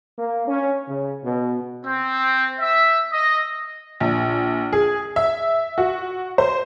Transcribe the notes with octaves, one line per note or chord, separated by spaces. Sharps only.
A#3
C#4
C#3
B2
C4
E5
D#5
A#1
G#4
E5
F#4
C5